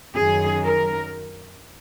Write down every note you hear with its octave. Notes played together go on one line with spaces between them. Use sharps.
F#2 D#3 F#3 G#4
A#4